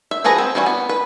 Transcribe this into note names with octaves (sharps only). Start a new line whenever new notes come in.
E5
F3 F#4 G#4 B4 A#5
C4
E3 G3 C#4 E4 F#4
B3
B4